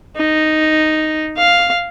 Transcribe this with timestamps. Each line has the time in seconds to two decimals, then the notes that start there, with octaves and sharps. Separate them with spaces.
0.17 D#4
1.37 F5